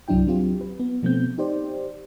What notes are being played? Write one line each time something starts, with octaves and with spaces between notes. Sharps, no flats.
C2 G2 F#3 D4 E4 G5
F#3 C4 F4 G4
B4
B3
B2 F3 A3 B3 C4 G6
D#4 G4 C5 D5